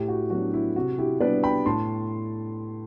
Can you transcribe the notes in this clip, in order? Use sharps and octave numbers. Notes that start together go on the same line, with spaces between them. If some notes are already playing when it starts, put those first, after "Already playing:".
Already playing: A2 E4 G4
F#4
F#3 B3 D4 F#4
E4
C3 F#4
E4 G4
G3 B3 D4 B4 D5
G5 B5
A2 A5 C6